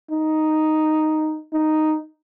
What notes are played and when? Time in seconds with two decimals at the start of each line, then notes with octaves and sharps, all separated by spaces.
0.11 D#4
1.54 D#4